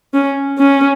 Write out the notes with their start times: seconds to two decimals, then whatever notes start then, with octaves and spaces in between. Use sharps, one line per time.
0.14 C#4
0.58 C#4